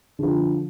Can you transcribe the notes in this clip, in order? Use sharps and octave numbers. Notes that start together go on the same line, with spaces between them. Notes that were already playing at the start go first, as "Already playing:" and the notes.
D3 F3